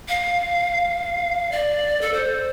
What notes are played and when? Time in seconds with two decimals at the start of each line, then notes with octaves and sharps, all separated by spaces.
0.08 F5
1.52 D5
2.01 A4
2.13 C5